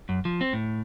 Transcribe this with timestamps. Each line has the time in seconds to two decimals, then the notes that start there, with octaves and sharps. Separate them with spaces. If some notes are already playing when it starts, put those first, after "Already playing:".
0.09 F#2
0.25 F3
0.41 C4
0.53 A2